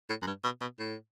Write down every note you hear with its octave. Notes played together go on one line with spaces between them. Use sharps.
A2
F#2
G2
B2
B2
A2